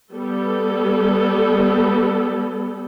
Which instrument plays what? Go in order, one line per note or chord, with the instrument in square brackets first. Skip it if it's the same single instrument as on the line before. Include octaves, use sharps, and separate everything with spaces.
[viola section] G3 B3 A4